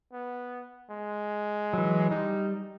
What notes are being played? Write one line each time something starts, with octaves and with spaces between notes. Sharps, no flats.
B3
G#3
E3 F#3
G3 D#4